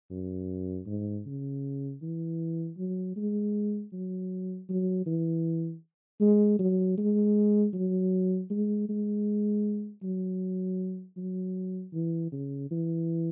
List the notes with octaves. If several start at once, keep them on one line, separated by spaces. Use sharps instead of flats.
F#2
G#2
C#3
E3
F#3
G#3
F#3
F#3
E3
G#3
F#3
G#3
F#3
G#3
G#3
F#3
F#3
E3
C#3
E3